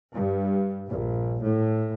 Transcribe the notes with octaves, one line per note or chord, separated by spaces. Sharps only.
G2
A#1
A2